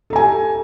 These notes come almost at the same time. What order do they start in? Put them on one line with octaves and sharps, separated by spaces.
A4 A#5 G#5 G4